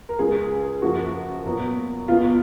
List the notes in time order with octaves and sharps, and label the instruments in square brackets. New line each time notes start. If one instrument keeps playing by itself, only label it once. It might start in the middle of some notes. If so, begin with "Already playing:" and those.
[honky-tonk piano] A#4
C#2 C#3 G#3 G#4
F#2 F3 A#3 F#4
A#2 F#3 B3
C#2 B2 F#3 B3 F4